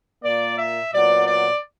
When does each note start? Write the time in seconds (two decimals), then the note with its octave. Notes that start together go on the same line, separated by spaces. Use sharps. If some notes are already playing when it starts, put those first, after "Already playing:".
0.23 A#2 A#3 D5
0.58 E5
0.93 A#2 F#3 B3 D5
1.27 D5